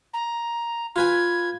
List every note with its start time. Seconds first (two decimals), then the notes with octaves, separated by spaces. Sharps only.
0.13 A#5
0.96 F4 B4 G#5 G#6